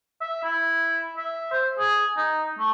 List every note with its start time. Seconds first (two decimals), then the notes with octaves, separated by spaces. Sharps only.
0.21 E5
0.43 E4
1.17 E5
1.52 C5
1.79 G#4
2.17 D#4
2.59 A3